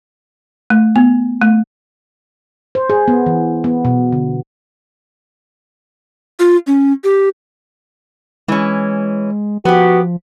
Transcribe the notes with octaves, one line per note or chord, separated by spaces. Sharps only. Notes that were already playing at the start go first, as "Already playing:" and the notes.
A3
B3
A3
C5
G#4
B3
E3
B3
B2
D3
F4
C#4
G4
E3 G#3 C#4
F3 B3 F#4 G4